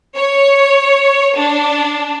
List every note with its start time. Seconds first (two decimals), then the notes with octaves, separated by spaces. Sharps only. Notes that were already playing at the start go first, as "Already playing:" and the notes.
0.16 C#5
1.37 D4